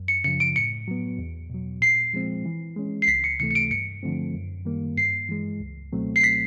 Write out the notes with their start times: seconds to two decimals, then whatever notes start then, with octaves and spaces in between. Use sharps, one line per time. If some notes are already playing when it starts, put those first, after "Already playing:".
Already playing: F#2
0.08 C#7
0.24 C#3 F3 C#7
0.40 D7
0.56 A2 C#7
0.88 F#3 B3
1.19 E2
1.50 B2 F#3
1.81 A#2 C7
2.14 F3 G#3 C4
2.45 E3
2.76 G#3 C#4
3.02 C7
3.07 C#2 B6
3.24 C#7
3.40 C3 E3 A3 C#7
3.51 C#7
3.55 D7
3.71 G2 C#7
4.03 D3 F3 A3 C4
4.34 F#2
4.65 D#3 G3 A#3
4.97 G2 C7
5.29 E3 G#3
5.60 C#2
5.93 B2 F#3 A3 C4
6.16 C7
6.24 B6